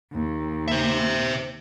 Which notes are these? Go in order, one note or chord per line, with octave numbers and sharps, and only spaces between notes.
D#2
C5 E5